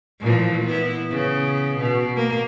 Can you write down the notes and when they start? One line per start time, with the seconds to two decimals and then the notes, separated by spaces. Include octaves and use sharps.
0.20 A#2 E3 F3
0.65 B3 E4
1.11 C#3 B3
1.79 B2
2.16 A#3